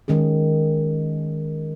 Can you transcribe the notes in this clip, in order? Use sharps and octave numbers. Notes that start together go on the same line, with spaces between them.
D#3 G#3 C#4 G#4